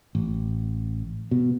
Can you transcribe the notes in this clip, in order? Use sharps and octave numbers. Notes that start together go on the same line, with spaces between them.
A1
B2